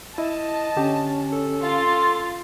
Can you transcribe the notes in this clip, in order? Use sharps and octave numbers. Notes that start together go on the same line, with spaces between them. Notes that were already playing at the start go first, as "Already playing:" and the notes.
E4 D#5 A5
D3 C#4 G4
A4
F4 C6 A6